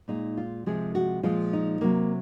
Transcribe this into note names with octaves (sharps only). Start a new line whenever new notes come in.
A#2 G#3 D#4
F4
C3 F3 G#3 G#4
F#4
A#2 F3 G#3 F4
D#4
C3 F#3 A#3